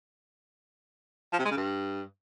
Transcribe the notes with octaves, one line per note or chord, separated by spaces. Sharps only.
F3
C3
G#3
C#3
G2